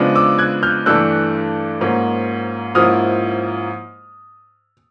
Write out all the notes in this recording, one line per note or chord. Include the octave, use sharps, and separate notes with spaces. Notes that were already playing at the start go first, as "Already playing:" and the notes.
Already playing: C#3 F3 G#3 B3 D4
D6 E6
F#6 G#6
F6 G6
G2 E3 A3 D4 E6 F#6
G#2 F3 A#3 C#4
G#2 F3 A#3 C#4 E4 D#6 F6